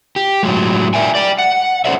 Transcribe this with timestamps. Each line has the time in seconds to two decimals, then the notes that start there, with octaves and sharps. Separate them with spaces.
0.16 G4
0.43 A2 F#3 G#3
0.94 A#4 D5 E5 G5 G#5
1.15 D5 G5
1.38 F#5
1.85 C#4 A4 A#4 C5 D5 E5